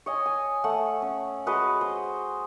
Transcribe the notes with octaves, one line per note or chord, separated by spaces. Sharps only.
C#5 D#5 G#5
G#5
A3 F#5
C#4
G#3 F#4 B4 D#5
C5